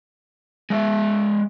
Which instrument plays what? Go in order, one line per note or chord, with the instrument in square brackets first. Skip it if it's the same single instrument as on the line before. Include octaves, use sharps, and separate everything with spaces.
[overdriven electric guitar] G#3 E5